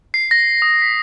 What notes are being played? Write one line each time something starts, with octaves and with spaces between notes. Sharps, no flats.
C7
A#6
D#6
B6